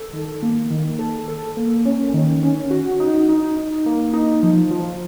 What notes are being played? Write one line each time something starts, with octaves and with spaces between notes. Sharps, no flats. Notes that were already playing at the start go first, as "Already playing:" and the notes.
Already playing: A4
D#3
A#3
D#3
A4
A4
A#3
C#4
D#3
C#4
F#4
D#4
D#4
D#4
A#3
D#4
F3
F3